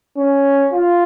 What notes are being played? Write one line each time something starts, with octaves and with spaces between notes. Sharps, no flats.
C#4
F4